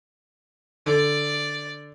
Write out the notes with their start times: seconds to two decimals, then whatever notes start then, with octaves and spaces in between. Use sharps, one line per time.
0.86 D3 D5